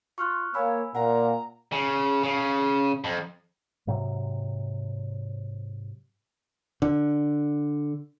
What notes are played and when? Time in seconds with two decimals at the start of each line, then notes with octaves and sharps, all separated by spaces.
0.18 F4 C#6 F6 F#6
0.54 A#3 C#5 G#5 B5 E6
0.95 A#2 F#5 A#5
1.72 C#3
2.24 C#3
3.04 F2
3.87 G#2 C3 F#3
6.82 D3